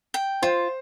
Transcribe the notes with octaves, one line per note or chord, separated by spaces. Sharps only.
G5
F4 C5